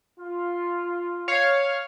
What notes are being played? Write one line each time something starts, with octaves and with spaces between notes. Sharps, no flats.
F4
C#5 F5